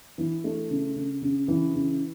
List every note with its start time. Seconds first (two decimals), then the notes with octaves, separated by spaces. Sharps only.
0.18 E3
0.44 A3
0.70 C#3
0.96 C#3
1.22 C#3
1.48 E3
1.74 C#3